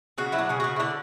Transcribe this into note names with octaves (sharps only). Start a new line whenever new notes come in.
C#3 F#4
F#3 E4
D4
C#3 G#4
C#3 F#4
E4
D3 D4